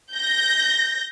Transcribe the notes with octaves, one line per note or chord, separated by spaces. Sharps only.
G6 A#6